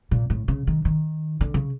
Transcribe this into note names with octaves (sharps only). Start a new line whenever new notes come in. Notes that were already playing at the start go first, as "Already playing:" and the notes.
A#2
A2
C#3
D#3
D#3
D3
C#3